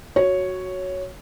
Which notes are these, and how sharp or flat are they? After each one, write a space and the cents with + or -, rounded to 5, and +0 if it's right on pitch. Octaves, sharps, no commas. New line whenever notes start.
F#4 +0 C#5 +0